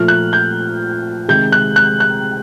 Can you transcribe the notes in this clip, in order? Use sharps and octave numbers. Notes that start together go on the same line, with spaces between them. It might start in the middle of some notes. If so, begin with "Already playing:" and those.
Already playing: A#2 F3 A3 F6
F#6
G6
C3 D#3 G#3 G6
F#6
F#6
F#6